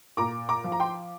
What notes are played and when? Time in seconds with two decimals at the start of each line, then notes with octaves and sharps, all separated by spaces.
0.17 A#2 A#5 D6
0.49 A#5 D6
0.64 F3
0.72 A#5
0.80 G5 C6